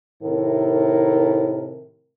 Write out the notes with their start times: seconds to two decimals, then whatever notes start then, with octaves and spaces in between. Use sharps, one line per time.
0.22 A2 C3 D#3 A#4